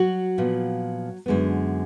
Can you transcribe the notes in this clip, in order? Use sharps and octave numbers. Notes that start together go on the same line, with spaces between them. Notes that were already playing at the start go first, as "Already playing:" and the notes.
Already playing: F#3 F#4
A#2 F3 B3
F#2 D3 G#3 B3